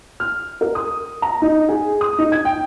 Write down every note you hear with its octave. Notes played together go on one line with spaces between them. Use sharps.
F6
A#4
D#6
A#5
D#4
G#4
D#6
D#4
G#6
G5